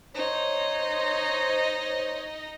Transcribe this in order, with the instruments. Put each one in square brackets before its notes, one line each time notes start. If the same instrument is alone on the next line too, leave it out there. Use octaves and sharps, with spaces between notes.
[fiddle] D#4 D#5 [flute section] C5 C#5